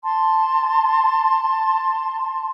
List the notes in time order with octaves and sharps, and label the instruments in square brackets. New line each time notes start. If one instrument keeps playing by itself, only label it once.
[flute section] A5 C6